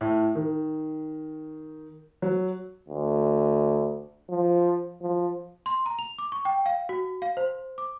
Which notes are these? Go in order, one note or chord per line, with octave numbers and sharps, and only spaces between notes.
A2
D#3
F#3
D2
F3
F3
C6
A#5
F7
D6
C#6
G5
F5
F#4
F5
C5
D6